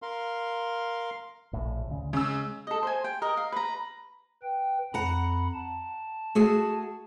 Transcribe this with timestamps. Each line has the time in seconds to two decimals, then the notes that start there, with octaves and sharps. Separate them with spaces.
0.02 A#4 F5 C6
1.53 A#1 A2
1.87 D2 C#3
2.13 C#3 G#3 E6
2.67 A4 D#5
2.83 C5 G#5
3.04 G5
3.22 A#4 D#5
3.37 F5
3.52 B4 A#5
4.43 B4 G5
4.94 F2 F#5 A#5 B5
5.54 A5
6.35 A3 F#4 G#4